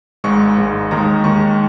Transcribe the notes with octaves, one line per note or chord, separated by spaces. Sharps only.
G#1 G#2 G#3 C#6
G#1 G#2 G#3
D#2 D#3 G#3 A#5
D#2 D#3 G#3 C#6